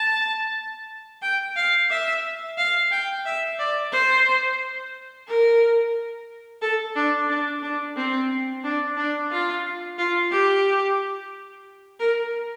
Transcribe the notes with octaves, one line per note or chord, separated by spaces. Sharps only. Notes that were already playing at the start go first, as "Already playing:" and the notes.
Already playing: A5
G5
F5
E5
F5
G5
E5
D5
C5
A#4
A4
D4
D4
D4
C4
D4
D4
F4
F4
G4
A#4